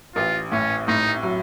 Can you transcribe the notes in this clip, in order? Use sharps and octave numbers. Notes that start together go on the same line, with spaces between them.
A1 F4
A2 C#4
A2 D#4
F#3